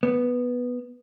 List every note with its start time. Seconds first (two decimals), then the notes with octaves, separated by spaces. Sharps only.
0.03 B3